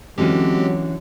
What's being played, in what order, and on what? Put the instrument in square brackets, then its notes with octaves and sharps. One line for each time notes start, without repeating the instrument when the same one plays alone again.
[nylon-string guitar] D3 E3 C#4 [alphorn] F#3 [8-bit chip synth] G#3 C4 G4